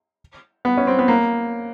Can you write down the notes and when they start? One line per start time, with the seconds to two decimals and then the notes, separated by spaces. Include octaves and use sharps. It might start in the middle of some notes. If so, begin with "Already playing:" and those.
0.65 B3
0.77 C#4
0.87 C4
0.99 B3
1.08 A#3